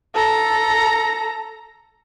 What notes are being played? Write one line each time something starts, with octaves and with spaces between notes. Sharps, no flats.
A4 A#5